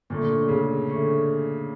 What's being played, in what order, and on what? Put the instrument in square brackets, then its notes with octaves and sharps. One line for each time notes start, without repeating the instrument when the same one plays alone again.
[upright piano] A#2 [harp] D3 A3 C#4
[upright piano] C#3
[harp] D3 A3 C#4